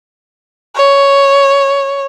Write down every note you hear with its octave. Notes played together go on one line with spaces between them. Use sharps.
C#5